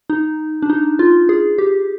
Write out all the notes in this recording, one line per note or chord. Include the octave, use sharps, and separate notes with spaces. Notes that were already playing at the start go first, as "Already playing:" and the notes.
D#4
D4
D#4
F4
G#4
G4